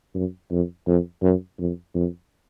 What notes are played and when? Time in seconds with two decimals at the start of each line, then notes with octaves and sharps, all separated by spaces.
0.15 F#2
0.51 F2
0.87 F2
1.23 F#2
1.59 F2
1.95 F2